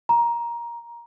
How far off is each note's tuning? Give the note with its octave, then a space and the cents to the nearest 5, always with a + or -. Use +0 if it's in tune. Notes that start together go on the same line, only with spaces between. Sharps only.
A#5 +15